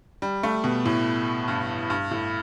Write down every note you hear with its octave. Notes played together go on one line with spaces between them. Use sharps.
G3
A3
B2
A2
G2
G2
A2